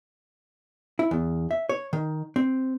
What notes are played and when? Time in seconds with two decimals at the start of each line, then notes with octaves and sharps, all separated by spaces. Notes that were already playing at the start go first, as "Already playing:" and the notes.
0.99 E4
1.11 E2
1.51 E5
1.69 C#5
1.93 D#3
2.36 C4